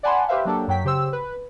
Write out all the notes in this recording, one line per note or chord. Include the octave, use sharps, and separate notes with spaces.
D5 F#5 G#5 A5 B5 C6
G4 B4 C5 E5 F5
F#3 A#3 D4 G4 A4
F#2 F#3 G5 B6
C#3 G4 C5 E6
B4